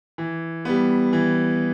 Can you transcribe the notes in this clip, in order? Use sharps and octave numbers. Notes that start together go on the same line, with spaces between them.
E3
G3 B3
E3